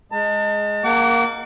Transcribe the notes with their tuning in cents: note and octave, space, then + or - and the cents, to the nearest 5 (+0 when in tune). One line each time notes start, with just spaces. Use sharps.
G#3 +0 A5 +35
A#3 +0 F#5 +20 D6 -35